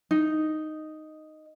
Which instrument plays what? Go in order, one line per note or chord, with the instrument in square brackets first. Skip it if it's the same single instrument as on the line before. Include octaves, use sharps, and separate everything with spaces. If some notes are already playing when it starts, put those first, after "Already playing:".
[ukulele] D#4